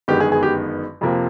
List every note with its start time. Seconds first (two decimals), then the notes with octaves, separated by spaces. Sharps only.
0.08 G1 F#2 D#3 G#3 B3 G4
0.20 G#4
0.32 G#4
0.43 G4
1.01 F2 C3 F3 A#3